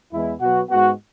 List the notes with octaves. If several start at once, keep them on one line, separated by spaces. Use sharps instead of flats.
E2 E3 G#3 B3 E4
B2 F#3 B3 F#4
G#2 G#3 B3 F#4